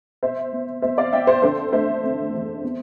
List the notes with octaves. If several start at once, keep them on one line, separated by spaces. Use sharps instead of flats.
B2 C5 E5
B3
B3 C5 E5
D5 F5
B3 E5 G5
C5 E5
D3 A4 C5
A3 C5 E5
C4
E2
B3